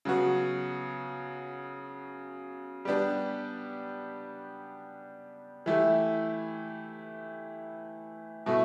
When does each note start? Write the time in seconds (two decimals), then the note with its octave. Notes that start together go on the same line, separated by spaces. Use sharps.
0.05 C#3 F#3 B3 F#4
2.85 G3 B3 D4 G4
5.66 E3 A3 E4 G4
8.46 B2 A3 E4